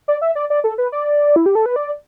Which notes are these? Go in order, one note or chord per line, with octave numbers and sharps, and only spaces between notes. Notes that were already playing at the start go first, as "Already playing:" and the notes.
D5
E5
D5
D5
A4
B4
D5
E4
G4
A4
B4
D5